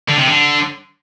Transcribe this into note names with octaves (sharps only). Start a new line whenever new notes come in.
D3
C3
D3